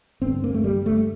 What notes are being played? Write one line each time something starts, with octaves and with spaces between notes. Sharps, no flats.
G2 D3 C4
A#3
A3
G3
A3